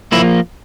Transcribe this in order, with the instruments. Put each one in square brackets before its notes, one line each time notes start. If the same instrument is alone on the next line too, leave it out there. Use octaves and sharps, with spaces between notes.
[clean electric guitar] F3 A#3 E4